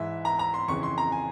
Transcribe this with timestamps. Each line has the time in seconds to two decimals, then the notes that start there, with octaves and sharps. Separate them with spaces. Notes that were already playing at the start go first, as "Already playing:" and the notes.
Already playing: G#2 E3 E5
0.25 A#5
0.39 A#5
0.54 C6
0.68 F2 C#3 E3 C#6
0.83 C6
0.98 A#5
1.12 G#5